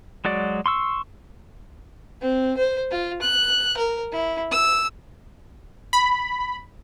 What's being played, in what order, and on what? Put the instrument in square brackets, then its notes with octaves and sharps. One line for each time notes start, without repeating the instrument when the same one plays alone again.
[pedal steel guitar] F#3 G#3 F#4 D5
C6 C#6 E6
[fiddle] C4
C5
F4
F#6
A#4
E4
E6
[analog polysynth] B5